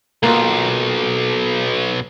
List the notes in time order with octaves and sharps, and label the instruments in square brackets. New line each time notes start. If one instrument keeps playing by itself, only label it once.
[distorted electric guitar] B1 [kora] A#3 F4